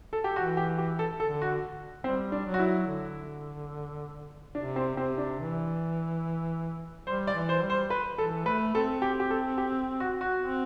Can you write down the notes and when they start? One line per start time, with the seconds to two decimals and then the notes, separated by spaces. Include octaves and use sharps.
0.13 A4
0.24 G4
0.36 E3 F#4
0.57 G4
0.78 G4
0.99 A4
1.20 D3 A4
1.42 F#4
2.04 G3 C4
2.32 D4
2.46 F#3
2.54 F#4
2.59 E4
2.87 D3
4.55 C3 D4
4.76 C4
4.97 C3 C4
5.18 D4
5.39 E3
7.06 G3 C5
7.27 D5
7.34 E3
7.49 C5
7.63 G3
7.70 C5
7.90 B4
8.18 E3 A4
8.46 A3 B4
8.75 C4 A4
9.02 G4
9.20 G4
9.30 A4
9.58 G4
10.00 F#4
10.21 F#4
10.42 C4